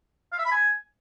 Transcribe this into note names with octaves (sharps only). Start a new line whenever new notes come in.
F5
E5
B5
G#5